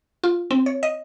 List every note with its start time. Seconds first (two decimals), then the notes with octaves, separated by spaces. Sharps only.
0.24 F4
0.51 C4
0.66 C#5
0.83 D#5